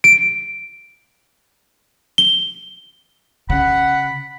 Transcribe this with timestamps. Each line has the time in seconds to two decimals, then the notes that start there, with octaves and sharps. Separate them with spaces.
0.04 D7
2.18 G7
3.50 C#3 F#5 B5